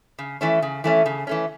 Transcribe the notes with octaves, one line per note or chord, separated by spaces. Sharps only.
C#3
E3 A3 C#4
C#3
E3 A3 C#4
C#3
E3 A3 C#4